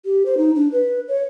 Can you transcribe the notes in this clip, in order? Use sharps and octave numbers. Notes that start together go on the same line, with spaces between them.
G4
C5
D#4
D4
B4
C#5